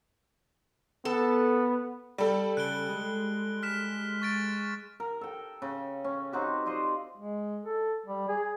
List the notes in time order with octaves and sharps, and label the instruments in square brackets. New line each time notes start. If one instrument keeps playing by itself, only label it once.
[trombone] B3 [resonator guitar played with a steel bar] A4
[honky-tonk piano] G3 A4
[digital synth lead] C#3 [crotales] F#6 D7 G7
[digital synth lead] G#3
[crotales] F6 B6 E7
C#6 A6 D7
[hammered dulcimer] A#4
A4 G5
C#3
C#4
C4 D#4 F#4 G4
F4 C5 D5 D#5
[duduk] G#3
A4
G3
G#4